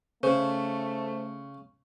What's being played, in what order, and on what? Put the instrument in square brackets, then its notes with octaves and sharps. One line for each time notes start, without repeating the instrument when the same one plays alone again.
[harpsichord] C#3 [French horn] A3 [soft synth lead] C5